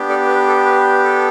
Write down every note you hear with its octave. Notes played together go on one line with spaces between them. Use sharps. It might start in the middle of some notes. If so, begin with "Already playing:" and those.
Already playing: B3 D4 G4
A4 D5
B4
A4
B4
A4